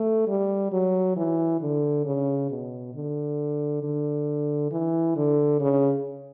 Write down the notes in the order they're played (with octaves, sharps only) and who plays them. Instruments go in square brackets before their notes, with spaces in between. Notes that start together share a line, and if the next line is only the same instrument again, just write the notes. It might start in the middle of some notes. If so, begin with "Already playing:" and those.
Already playing: [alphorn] A3
G3
F#3
E3
D3
C#3
B2
D3
D3
E3
D3
C#3